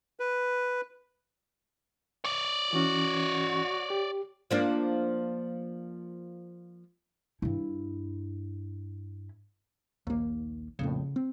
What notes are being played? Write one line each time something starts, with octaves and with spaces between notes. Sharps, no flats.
B4
C#5 D5
E3 C#4 F#4
G4
F3 A#3 D4
G2 E4
A#1 D#2 A#3
A#1 F2 A2 C#3
C4